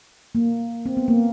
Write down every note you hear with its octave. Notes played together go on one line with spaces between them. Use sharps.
A#3
C4
B3
A#3